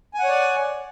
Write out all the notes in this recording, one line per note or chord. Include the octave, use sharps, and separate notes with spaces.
C#5 D5 F#5 G#5